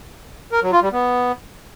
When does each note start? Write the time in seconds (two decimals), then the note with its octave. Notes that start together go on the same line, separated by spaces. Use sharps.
0.52 A#4
0.62 F#3
0.72 F4
0.82 G3
0.93 B3